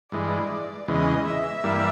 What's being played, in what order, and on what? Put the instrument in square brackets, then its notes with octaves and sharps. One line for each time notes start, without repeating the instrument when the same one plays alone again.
[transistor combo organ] G2 E3 G#3 [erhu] D5
[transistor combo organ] E2 C#3 E3 G#3 [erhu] D#5
[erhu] E5
[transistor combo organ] G2 E3 G3 A#3